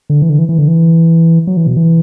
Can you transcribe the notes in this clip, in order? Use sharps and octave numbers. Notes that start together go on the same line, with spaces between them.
D3
E3
D3
E3
E3
D3
E3
F#3
E3
B2
E3